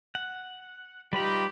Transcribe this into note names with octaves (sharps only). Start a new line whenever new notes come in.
F#5
G3 D#4 F4 G4 B4 B5